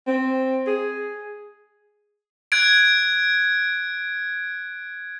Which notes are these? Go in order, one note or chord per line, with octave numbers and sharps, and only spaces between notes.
C4
G#4
F#6 G#6 D7